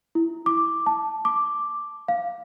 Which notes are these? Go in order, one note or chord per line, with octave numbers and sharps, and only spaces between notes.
E4
D6
A5
D6
F5